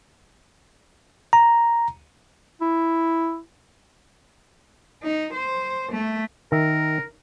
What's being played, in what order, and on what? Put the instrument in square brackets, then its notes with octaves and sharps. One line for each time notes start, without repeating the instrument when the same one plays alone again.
[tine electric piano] A#5
[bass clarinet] E4
[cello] D#4
C5
A3
[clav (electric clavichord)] D#3 E5 [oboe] A#4